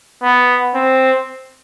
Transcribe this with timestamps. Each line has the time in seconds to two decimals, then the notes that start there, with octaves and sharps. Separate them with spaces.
0.23 B3
0.75 C4